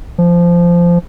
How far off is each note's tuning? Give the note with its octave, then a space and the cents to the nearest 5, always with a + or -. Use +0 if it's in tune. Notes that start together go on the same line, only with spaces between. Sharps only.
F3 -15